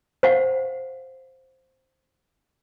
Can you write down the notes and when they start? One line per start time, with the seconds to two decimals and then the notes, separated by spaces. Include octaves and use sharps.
0.23 C5 F5 F#5